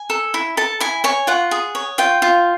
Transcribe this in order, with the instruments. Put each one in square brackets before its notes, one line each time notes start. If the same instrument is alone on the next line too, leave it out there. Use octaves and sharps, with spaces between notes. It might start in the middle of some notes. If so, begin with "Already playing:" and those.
Already playing: [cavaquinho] G#5
A4
E4
A4 A5
E4 G#5
C#5 G#5
F4 F#5
G#4
C#5
F4 G5
F4